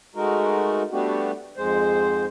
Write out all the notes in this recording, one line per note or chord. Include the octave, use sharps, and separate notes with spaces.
G#3 A3 D#4 F#4 A#4
G3 A3 B3 D4 F#4 G4
F2 G#2 G#3 C5